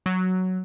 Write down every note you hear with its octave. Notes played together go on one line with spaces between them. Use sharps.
F#3